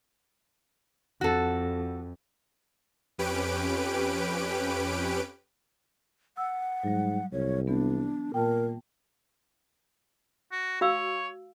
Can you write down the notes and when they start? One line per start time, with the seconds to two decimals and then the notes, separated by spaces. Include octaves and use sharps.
1.21 F2 F#4 A4
3.18 F2 C#4 G4 B4 D7
6.37 F#5 E6
6.83 G#2 F#3 G3
7.32 C2 C#5
7.67 E3 B3 D4
8.34 A#2 A#4 G5 A5
10.52 F#4
10.81 F#4 C#5 F5 E6